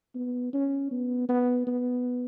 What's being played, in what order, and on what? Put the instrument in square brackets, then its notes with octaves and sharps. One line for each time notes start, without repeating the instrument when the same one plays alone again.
[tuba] B3
C#4
B3
B3
B3